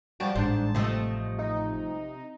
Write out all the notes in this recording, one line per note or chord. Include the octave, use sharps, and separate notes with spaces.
F3 G3 F#4 A5 D6 D7
A1 G#2 D4 C5
C3 F3 A3 A4 D#5
D#4